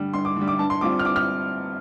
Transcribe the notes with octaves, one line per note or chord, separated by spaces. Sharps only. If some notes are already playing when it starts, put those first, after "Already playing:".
Already playing: G2 D3 G3
G2 C6
D6
D3 G3
D6
G2 A5
C6
G3 C4 F4 D6
F6
G2 D6
F6